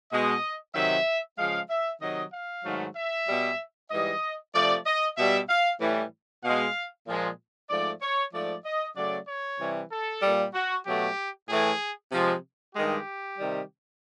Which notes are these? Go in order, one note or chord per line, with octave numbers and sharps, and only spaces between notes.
B2 G#3 D#5
C3 D#3 F#3 E5
C#3 F3 G#3 F5
E5
C3 D#3 F#3 D#5
F5
G#2 D#3 F#3 A3
E5
B2 G3
G#2 E3 G3 D#5
C3 F3 A3 D5
D#5
B2 G3 E5
F5
A2 E3 G3
B2 G#3 F5
A#2 F3 G#3
G#2 F3 A3 D5
C#5
G#2 F3 A3 D5
D#5
C#3 F#3 A3 D5
C#5
C3 E3 G3
A4
A#2 G3
F#4
B2 F#3 A3 G4
A2 E3 A3 G#4
C3 F3 G#3
G2 D#3 G#3 G4
C3 D#3 G3